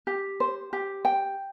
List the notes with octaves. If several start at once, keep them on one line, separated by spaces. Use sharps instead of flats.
G4
C5
G4
G5